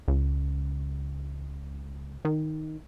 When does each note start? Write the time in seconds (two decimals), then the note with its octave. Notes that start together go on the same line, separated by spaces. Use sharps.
0.08 C#2
2.25 D#3